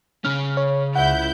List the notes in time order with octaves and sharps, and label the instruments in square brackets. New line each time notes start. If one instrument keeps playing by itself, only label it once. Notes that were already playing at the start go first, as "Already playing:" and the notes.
[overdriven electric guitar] C#3 C#4 [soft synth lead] F6
[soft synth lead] C#5
[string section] C#2 E4 G6 [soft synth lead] F#5